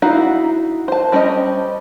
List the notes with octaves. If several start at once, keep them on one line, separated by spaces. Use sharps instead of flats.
D#4 E4 F#4 F5
C5 A5
G3 C#4 C5 D5 D#5